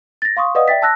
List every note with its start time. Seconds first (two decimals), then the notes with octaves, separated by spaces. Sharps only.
0.22 A6 A#6
0.37 F5 C6 C#6 D#6
0.55 B4 D5 D#5 F5 F#5 D#6
0.68 D5 E5 G5 A6 B6
0.82 A5 E6 F#6 A#6